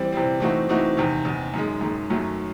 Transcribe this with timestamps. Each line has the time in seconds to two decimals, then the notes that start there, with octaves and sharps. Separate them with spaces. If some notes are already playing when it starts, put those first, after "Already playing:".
Already playing: E3 G3 C4
0.13 C3 E3 G3 C4
0.40 E3 A3 C4 D#4 F#4
0.69 E3 A3 C4 D#4 F#4
0.97 E2 C3 D#3
1.25 E2 C3 D#3
1.54 F#2 D#3 G#3
1.81 F#2 D#3 G#3
2.10 F#2 D#3 F#3 A3